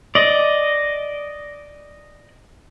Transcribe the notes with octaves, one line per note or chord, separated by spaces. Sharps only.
D5 D#5